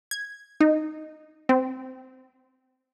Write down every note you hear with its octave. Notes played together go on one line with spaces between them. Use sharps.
G#6
D#4
C4